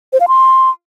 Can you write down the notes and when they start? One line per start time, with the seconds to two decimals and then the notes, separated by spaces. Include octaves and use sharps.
0.13 C5
0.20 F5
0.28 C6